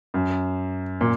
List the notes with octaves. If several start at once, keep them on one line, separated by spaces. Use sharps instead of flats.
F#2
A#2